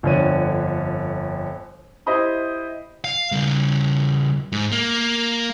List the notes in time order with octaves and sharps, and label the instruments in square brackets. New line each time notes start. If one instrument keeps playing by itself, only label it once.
[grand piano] G1 F2 D3 C#5 D#7
E4 G4 C5 D#5 B5 D#6
[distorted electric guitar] F5
C#3 G3
G#2
A#3